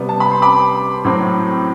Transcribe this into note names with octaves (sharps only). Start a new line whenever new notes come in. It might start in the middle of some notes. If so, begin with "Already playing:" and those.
Already playing: C3 G3 B3
A5
B5
C6
B5 D6
A2 F#3 C4